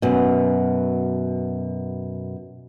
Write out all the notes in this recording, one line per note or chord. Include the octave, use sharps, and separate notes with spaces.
F#2 B2